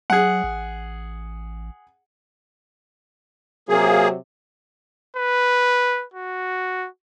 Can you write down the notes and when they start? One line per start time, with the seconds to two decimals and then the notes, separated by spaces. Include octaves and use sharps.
0.10 F#3 G#4 F#5
0.44 A1
3.69 C3 F#3 A#3 G#4
5.16 B4
6.14 F#4